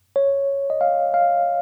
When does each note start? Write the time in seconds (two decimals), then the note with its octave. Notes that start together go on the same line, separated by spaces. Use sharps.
0.16 C#5
0.70 D#5
0.81 F5
1.14 F5